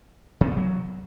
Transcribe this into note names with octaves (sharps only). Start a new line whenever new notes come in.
C3
B3
F3
F#3